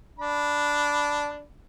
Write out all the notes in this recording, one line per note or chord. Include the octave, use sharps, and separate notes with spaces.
D4 B5